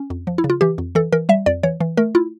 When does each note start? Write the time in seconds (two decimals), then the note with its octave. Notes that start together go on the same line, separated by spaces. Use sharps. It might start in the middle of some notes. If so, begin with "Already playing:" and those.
Already playing: C#4
0.10 F2
0.27 F3
0.38 E4
0.44 C#3
0.50 F4
0.61 E3 G4
0.78 F2
0.95 E3 A4
1.13 E3 A#4
1.29 G3 E5
1.46 F2 D5
1.63 E3 C#5
1.80 E3
1.97 A3 A#4
2.15 E4 F4